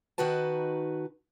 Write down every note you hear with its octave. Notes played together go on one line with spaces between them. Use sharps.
D#3 D#4 F#4 B4 A5